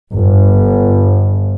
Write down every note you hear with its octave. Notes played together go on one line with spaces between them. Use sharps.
G1